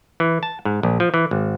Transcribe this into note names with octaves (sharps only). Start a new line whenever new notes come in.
E3
A5
G#2
A#1
F3
E3
G#1